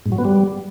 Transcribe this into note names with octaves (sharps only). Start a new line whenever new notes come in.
G#2
F#3
B3
G3